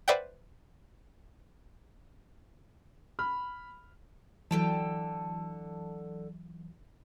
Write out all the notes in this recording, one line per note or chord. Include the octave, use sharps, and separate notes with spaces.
B4 C5 D5 E5 F#5 G5
B5 F6
D3 E3 F#3 G5 A5